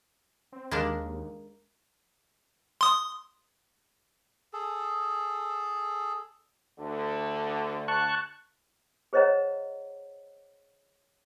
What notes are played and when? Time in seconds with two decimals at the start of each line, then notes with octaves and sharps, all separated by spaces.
0.52 C4
0.71 D#2 G#3 A#3 D4
2.81 C6 D#6
4.53 G#4 A4
6.79 D2 D3
7.88 A5 C#6 F#6
9.13 G#4 C5 C#5 D#5 F#5 A#5